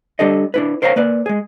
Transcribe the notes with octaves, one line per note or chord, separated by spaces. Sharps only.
G3 D4 G4 A4 D#5
D4 E4 B4
A#4 C5 C#5 F5 F#5 A#5
A#3 B4 D5
G#3 G#4